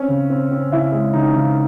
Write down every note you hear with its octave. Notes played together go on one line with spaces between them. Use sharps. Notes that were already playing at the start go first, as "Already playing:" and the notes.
Already playing: C4 C#4
C#3
C4
C4
C#3 E4
G#3
C#3 D#4
C#3